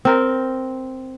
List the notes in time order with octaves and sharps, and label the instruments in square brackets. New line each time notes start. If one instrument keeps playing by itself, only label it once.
[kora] C4 A#4